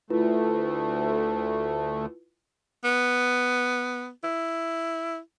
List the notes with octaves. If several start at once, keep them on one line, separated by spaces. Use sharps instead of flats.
D2 A3 E4 F4 B4
B3
E4